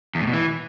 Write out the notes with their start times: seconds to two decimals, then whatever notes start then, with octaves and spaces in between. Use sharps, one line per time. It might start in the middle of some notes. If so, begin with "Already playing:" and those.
0.15 E2
0.21 A2
0.27 B2
0.33 E3